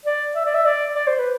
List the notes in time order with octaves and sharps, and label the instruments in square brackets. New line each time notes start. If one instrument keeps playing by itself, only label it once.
[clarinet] D5
E5
D5
E5
D5
D5
C5
B4